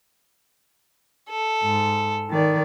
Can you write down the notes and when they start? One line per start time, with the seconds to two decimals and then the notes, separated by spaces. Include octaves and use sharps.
1.29 A4
1.63 G#2
2.30 D#3 D5